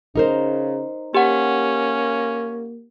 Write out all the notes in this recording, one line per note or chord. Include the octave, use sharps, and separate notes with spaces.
C#3 D#4 A#4 C5
A#3 C#4 G4 F#5